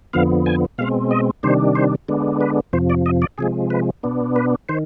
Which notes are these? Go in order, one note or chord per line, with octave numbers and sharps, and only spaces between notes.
F2 D3 F3 B3 F5
G#5
B2 G#3 C4 F5
D#5
C3 D#3 G3 D4 C5
C5
D3 G#3 B3 D4
B4
F2 C3 F3 C5
D5
D#5
D5
C3 F3 G#3 G#4
B4
B2 B3 D4
B4
D#3 C5